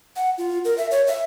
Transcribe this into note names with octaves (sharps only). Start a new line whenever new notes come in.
F#5
F4
A#4
E5
C#5
E5